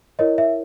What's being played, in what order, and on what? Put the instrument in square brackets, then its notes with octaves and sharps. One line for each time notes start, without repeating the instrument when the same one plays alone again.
[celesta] E4 A#4 C#5 D#5
E5